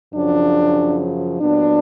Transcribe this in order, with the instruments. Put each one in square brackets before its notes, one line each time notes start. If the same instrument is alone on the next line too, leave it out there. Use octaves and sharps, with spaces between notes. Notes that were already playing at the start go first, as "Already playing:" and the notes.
[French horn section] F#2 C#3 F3 D4
A#2 F#3 B3 D4